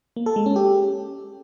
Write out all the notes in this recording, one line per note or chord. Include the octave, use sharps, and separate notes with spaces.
A#3
A4
G#3
C#4
G4